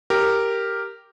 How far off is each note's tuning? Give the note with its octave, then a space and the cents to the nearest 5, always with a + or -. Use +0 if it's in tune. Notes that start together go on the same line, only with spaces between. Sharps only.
G4 +0 A#4 -5